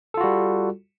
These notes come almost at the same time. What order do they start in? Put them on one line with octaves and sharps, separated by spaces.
A4 F4 F#4 G3